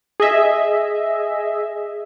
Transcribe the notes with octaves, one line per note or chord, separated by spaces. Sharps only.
G#4 D#5 E5